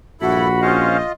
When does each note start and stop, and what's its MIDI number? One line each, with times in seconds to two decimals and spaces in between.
0.21 1.00 34
0.21 0.48 43
0.21 0.48 64
0.21 0.84 66
0.21 0.48 69
0.21 0.60 83
0.62 0.97 61
0.62 1.12 65
0.62 0.97 72
0.62 1.12 75
0.62 0.97 77